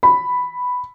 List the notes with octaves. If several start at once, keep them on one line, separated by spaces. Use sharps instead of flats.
B5